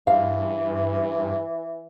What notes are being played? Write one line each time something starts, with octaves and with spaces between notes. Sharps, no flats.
G2 E3 F5